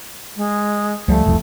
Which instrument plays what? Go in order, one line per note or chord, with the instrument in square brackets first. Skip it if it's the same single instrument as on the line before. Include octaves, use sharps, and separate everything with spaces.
[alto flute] G#3
[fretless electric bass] C#2 F3 G3 [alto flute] A3
[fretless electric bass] F1 C2 F2